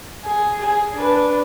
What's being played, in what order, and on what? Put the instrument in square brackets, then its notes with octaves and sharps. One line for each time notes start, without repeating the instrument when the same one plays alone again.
[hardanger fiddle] G#4
G#4
D4 B4